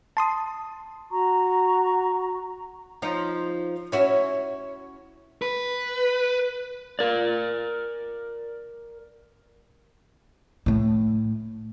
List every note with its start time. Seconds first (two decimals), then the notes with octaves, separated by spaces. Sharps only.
0.17 A5 C6 D#6
1.10 F#4 A#5 C#6
3.02 F3 D#4
3.92 C#4 E4 F#4
5.42 B4
6.99 A#4 D5
10.66 A2 A3